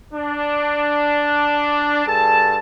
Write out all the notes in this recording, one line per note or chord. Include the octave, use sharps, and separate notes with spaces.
D4
G2 G#4 A4 A5